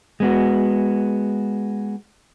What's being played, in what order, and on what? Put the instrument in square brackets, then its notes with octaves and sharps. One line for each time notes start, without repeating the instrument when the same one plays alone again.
[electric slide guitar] G#3 B3 F#4